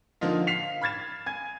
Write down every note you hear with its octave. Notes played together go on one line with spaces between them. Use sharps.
D3 F3 A#3 D#4 F4
F5 B6 C7 F7
B5 F6 G#6 A6 E7
G#5 G#6